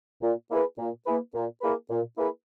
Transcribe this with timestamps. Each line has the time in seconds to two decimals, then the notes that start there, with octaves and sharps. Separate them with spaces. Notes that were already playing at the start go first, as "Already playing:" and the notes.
0.22 A#2
0.50 A#3 E4 G#4 B4
0.78 A#2
1.05 A#3 E4 G#4 B4
1.34 A#2
1.61 A#3 E4 G#4 B4
1.90 A#2
2.18 A#3 E4 G#4 B4